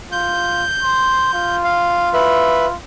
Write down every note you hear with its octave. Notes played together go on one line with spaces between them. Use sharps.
F4 G6
C6
F4
F5
B4 E5